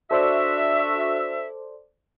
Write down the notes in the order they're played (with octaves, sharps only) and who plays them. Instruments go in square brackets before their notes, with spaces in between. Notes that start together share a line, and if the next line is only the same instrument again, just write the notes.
[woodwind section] D4 F#4 E5 [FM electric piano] A4 C5 D5